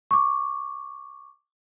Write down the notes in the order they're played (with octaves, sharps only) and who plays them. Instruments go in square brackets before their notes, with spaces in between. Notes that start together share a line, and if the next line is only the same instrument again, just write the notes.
[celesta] C#6 D6